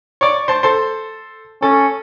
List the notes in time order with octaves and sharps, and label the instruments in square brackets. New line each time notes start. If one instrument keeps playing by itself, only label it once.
[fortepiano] C#5 D5
C5 A5
A4 C5
[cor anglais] C#4 [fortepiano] A4